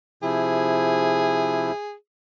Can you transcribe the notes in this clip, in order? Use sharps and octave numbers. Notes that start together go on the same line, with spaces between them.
C3 F3 E4 G#4